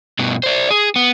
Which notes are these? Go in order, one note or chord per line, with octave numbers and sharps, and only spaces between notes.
G2 B2
C5 D5
G#4
B3